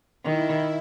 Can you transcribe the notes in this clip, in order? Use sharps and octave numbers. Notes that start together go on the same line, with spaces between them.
D#3 E4